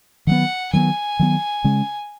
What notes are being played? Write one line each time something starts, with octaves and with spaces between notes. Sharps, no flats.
D#3 F#3 B3 F#5
D#3 F#3 B3 G#5
D#3 F#3 B3
C#3 G#3 C#4